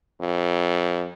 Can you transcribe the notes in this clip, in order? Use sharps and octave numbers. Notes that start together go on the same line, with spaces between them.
F2